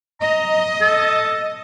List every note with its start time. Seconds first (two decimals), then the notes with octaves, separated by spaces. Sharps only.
0.21 D#5 A#5
0.81 A4